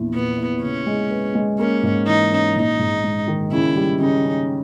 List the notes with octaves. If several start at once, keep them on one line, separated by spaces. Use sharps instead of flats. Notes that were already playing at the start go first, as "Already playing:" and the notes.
Already playing: A#1 E2 E4
A#2 B3
E4
C#3 C#4
G#3
B3
G#3
A#3 C#4
G#2
E3 D#4
C#4
A#1 D#4
G#2
G#3
D#3
C#3 E4
G3
C#3 D#4
C#4